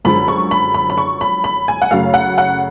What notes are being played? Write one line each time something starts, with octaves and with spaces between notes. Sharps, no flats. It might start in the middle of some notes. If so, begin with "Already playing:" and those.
F#2 D3 F3 G#3 B5
C#6
B5
B5
B5
C#6
B5
B5
G#5
F#5
F#2 C#3 F#3 A3 F5
F#5
F#5